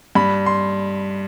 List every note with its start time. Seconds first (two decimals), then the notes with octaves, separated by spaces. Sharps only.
0.15 G2 B5
0.46 C6